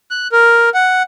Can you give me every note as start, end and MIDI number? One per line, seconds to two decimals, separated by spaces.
0.11 0.28 90
0.32 0.69 70
0.74 1.03 78